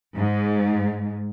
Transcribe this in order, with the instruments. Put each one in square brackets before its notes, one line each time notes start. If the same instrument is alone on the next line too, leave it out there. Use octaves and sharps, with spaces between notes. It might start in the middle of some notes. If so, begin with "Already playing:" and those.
[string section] G#2